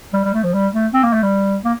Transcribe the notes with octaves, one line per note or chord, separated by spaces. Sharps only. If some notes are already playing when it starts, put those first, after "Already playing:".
G3
G3
A3
F3
G3
A3
C4
A#3
A3
G3
A#3